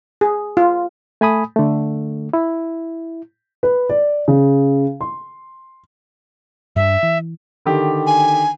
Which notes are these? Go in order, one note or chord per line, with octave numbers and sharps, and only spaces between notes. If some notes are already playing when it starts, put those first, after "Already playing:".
G#4
F4
A3 G#5 B5 D#6
D3 A3
E4
B4
D5
C#3
C6
G2 D4 E5
E3
D3 D#3 G4
G#5